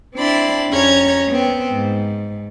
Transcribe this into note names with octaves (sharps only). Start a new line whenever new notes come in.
C4 D4 E4 D5 B5 C6
F2 C#4 C#5 A#5 G#6
B3 C4
G#2